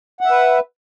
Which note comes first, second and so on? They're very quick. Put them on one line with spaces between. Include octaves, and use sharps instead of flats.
F#5 E5 B4